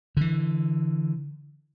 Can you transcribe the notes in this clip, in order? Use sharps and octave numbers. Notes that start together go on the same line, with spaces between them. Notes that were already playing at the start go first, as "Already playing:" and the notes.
D3 E3